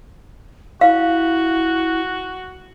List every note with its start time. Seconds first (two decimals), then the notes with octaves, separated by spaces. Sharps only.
0.81 E4 F#4 F5